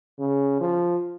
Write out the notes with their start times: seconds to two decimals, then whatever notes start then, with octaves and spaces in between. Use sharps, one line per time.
0.19 C#3
0.61 F3